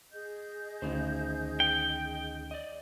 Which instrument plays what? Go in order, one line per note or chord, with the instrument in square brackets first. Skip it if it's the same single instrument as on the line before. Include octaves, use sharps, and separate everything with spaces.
[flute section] G#4 D#5 G6
[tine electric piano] D2 C#4 [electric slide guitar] D#3 D#4 C5
[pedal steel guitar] G5
[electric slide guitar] D5 D#5